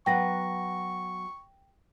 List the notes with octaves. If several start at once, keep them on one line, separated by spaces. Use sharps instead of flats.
F#3 B3 F#5 G5 C#6 A#6